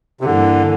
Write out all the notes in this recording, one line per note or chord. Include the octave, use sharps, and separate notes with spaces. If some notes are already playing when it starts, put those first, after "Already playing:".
C3
G2 D3 E3 A#3